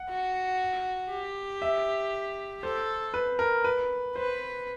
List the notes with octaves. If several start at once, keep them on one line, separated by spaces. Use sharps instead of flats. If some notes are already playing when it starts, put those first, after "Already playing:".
Already playing: F#5
F#4
G4
E5
A4 C5
B4
A#4
B4
B4 C5